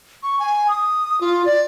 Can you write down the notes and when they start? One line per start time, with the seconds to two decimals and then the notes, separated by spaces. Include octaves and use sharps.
0.23 C#6
0.39 G#5
0.68 D#6
1.21 F4
1.45 D5